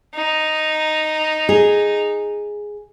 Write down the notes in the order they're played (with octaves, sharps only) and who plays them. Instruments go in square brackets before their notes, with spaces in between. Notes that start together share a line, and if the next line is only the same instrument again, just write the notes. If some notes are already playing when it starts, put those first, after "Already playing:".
[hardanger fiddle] D#4
[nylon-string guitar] G#4